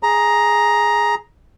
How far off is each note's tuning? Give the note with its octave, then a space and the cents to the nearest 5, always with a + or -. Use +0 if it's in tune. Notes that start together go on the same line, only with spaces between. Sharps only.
G#4 +0 A#5 +10